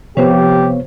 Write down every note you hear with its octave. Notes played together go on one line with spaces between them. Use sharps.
C3 F3 B3 G4 C#5